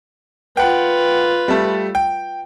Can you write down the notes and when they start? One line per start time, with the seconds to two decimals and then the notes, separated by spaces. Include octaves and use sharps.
0.57 F4 B4 F#5 G5
1.48 G3 A3
1.95 G5